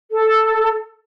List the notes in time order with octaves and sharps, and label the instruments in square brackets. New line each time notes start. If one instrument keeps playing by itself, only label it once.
[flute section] A4